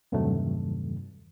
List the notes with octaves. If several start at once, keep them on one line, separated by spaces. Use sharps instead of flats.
E2 G2 C3 D#3 F#3 A3